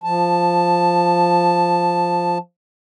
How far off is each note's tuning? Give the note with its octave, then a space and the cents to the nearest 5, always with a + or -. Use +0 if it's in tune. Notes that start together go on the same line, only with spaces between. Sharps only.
F3 +0 A5 +0